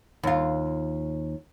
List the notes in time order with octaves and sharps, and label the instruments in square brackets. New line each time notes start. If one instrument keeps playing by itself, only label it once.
[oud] D#2 F4